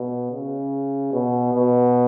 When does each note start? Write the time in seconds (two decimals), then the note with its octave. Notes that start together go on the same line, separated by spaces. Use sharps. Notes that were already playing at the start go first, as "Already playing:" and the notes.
Already playing: B2
0.32 C#3
1.13 B2
1.54 B2